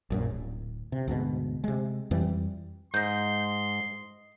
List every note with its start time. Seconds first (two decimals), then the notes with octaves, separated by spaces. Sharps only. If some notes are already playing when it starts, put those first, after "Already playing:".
0.10 A#1 F#2 A#2
0.30 D1
0.92 C3
1.08 D2 G#2 B2
1.64 C3 G#3
2.11 F2 E3 G3
2.94 G#2 D#5 C6 G6